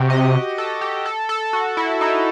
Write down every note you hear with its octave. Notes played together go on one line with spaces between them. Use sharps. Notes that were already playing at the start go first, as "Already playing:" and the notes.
Already playing: C3 F#4 G4
D#5
A4
G4
A4
A4
F#4
E4
D#4